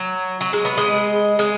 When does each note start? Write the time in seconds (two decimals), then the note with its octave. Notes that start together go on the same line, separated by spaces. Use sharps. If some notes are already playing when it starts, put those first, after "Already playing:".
Already playing: F#3
0.41 F#3
0.53 G#3
0.65 B3
0.77 G#3
1.39 G#3